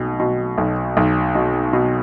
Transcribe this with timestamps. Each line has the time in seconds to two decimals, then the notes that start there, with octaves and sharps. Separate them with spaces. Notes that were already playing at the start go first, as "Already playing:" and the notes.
Already playing: B1 B2
0.20 B2
0.58 B1
0.97 B1
1.35 B2
1.73 B2